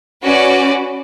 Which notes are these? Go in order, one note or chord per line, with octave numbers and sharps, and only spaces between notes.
C#4 F#4 B4 D5